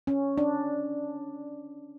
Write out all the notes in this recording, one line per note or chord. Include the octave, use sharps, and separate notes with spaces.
C#4
D4